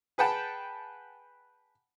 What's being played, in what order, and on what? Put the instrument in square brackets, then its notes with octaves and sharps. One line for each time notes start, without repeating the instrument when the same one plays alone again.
[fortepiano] G#4 B4 F#5 G5 A5